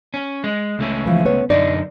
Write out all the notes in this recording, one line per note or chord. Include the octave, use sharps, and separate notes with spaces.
C#4
G#3
C#2 A3 C#4
E3 F3
B3 C#5
F#2 D3 D#4 D5